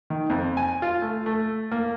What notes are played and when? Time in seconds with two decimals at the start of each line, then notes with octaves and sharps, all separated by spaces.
0.10 D#3
0.30 F2
0.57 G#5
0.82 F4
1.02 A3
1.26 A3
1.72 A#3